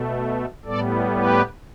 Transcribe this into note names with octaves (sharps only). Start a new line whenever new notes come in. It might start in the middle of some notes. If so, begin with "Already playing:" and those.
Already playing: B2 A3
A2 G3 B3 A4 D5
G4 B4